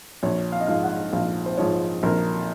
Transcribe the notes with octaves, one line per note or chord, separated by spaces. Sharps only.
A#1 C#5
F5
D#5
G#2 F3 G#3 F5
F#5
A#1 F5
C5
G#2 F3 G#3 C#5
A#1 A#4